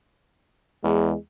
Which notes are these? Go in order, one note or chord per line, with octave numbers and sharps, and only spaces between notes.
E2 G#3